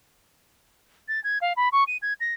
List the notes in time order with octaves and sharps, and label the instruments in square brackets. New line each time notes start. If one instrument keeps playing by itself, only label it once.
[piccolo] A6
G#6
F5
B5
C#6
D#7
G#6
A#6